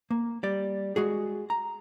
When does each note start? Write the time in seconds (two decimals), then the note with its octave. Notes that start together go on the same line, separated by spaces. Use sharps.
0.10 A#3
0.43 G3 D5
0.96 G#3 F#4 G#4
1.50 A#5